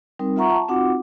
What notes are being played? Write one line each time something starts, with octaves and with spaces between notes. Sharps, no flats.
G3 C4 D#4 A#4
F4 E5 F#5 A#5 C#6
A5
C4 D#4 F4 F#4 F#5 D6